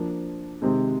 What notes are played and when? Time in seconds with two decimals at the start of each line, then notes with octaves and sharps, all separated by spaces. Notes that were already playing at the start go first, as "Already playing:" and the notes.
Already playing: F3 A#3 D4
0.62 C3 D#3 G#3 C4